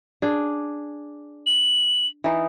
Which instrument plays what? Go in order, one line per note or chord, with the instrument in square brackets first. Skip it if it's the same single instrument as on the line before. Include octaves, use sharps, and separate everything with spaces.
[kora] D4 G#4
[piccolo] F#7
[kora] E3 D#4